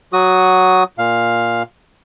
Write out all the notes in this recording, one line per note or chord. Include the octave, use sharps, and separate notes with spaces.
F#3 F#4 D#6
A#2 F5